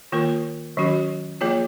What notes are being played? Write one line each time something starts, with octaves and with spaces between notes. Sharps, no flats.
D#3 A#3 F4 A#4
D#3 F#3 C#4 F#4
F3 A#3 F4 G#4 C#5